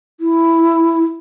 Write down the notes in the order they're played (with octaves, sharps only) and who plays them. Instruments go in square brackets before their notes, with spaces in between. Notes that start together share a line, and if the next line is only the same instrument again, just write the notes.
[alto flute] E4